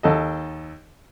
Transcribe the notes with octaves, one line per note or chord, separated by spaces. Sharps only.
D#2 A4 D#5